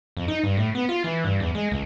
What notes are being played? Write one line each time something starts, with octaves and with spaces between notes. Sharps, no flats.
F2
D#4
G2
A2
B3
F4
E3
G2
E2
G#3
C#2